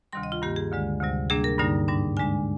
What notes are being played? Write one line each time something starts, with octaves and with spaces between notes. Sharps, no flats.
D2 C3 D#3 G3 C6
D#5
F4
G2 D#3 A#3 G4
G#4
D2 D3 G#3
D2 C3 G3
C3 G3 A#3 D4 G#4
A#4
G2 D3 G3 A#3 D#4
G#2 G3 D4
D3 G#3 D4 G#5